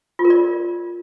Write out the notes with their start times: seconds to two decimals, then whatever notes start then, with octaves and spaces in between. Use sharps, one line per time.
0.19 F4
0.25 A#4
0.30 D5